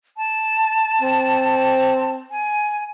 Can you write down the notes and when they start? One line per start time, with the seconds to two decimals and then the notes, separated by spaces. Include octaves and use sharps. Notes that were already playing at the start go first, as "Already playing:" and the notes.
0.17 A5
1.01 C4
2.31 G#5